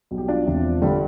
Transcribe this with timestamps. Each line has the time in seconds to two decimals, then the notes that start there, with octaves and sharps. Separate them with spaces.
0.11 B1 B2 G3
0.18 G4
0.28 D4 F4
0.46 E1 E2 C3 F3
0.82 G1 G2 D3 G3